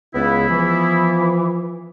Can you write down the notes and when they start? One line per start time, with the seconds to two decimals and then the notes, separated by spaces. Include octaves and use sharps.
0.15 C#2 C#3 B3 E4
0.48 E3 F3